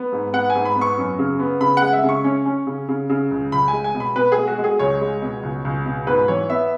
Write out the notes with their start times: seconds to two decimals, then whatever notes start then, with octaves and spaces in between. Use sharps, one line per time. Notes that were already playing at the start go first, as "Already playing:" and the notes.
Already playing: B3
0.12 G#2
0.33 B3 F#5
0.50 G#5
0.55 G#2
0.65 B5
0.76 B3
0.81 C#6
0.98 F#2
1.19 C#3
1.39 B3
1.61 C#3 B5
1.77 F#5
1.82 G#3
1.93 E5
2.04 C#3
2.09 C#6
2.24 C#4
2.46 C#4
2.67 C#3
2.89 C#3
3.10 C#3
3.31 C#2
3.52 C#2 B5
3.68 G#5
3.73 G#3
3.84 G#5
3.94 B2
4.00 B5
4.16 B2 B4
4.32 G#4
4.37 G#3
4.48 F#4
4.58 G#3
4.64 G#4
4.79 C#2 C#5
5.01 G#3
5.22 B2
5.43 C#2
5.65 C#2
5.86 B2
6.07 G#2 B4
6.28 E3 C#5
6.49 B3 E5